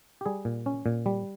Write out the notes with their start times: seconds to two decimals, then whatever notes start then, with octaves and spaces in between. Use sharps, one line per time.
0.21 G4
0.26 G3 G#4
0.45 A#2
0.66 C#4
0.86 A#2
1.06 G3